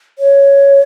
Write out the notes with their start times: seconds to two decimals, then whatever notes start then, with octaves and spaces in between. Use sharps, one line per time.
0.19 C#5